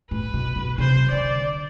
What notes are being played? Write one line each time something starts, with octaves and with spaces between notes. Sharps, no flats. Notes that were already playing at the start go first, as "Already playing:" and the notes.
A2 B4
B2
B2
C3 C5
D3 D5